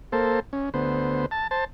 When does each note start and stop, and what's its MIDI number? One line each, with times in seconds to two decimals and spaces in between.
0.12 0.40 58
0.12 0.40 69
0.12 0.40 72
0.53 0.70 61
0.74 1.26 38
0.74 1.26 59
0.74 1.26 72
1.31 1.47 81
1.51 1.65 72
1.51 1.65 81